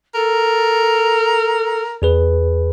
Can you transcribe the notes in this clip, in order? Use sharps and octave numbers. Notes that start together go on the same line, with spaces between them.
A4 A#4
E2 G#4 B4